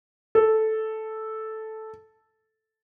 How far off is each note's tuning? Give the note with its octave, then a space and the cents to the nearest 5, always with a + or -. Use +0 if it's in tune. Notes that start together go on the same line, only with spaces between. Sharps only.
A4 -5